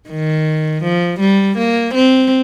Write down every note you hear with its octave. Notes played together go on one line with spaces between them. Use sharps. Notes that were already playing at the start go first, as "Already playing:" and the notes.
D#3
F3
G3
A#3
C4